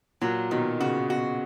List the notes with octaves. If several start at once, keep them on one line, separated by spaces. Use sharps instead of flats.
A#2 F#3
B2 D#3
C#3 F#4
B2 F#4